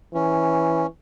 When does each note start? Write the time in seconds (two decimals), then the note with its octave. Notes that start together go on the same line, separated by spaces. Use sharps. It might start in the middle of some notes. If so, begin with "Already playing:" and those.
0.14 E3 C#4